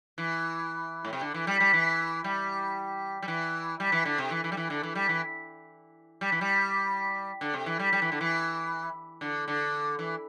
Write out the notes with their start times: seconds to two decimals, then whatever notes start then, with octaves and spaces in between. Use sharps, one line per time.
0.18 E3
1.05 A2
1.13 C3
1.21 D3
1.34 E3
1.47 G3
1.60 G3
1.73 E3
2.24 G3
3.23 G3
3.28 E3
3.80 G3
3.92 E3
4.05 D3
4.18 C3
4.31 E3
4.44 E3
4.52 G3
4.57 E3
4.70 D3
4.83 E3
4.95 G3
5.09 E3
6.21 G3
6.32 E3
6.41 G3
7.41 D3
7.54 C3
7.66 E3
7.79 G3
7.92 G3
8.02 E3
8.12 D3
8.21 E3
9.21 D3
9.48 D3
9.99 E3